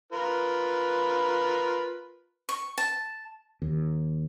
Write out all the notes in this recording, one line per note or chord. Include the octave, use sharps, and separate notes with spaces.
F4 A#4 B4
C#6
A5
D#2